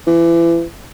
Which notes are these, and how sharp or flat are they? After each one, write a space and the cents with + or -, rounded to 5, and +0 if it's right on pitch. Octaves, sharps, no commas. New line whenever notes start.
E3 +30